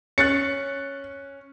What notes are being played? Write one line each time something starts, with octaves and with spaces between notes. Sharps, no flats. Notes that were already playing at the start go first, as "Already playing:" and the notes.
C#4 F#6 A6 C#7